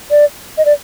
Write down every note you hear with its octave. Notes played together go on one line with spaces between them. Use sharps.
D5
D#5
D5